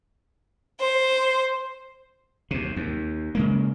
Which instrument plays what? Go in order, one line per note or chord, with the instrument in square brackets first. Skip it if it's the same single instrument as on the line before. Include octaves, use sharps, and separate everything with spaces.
[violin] C5
[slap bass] D#2 C3
D#2
C#3 G#3 A#3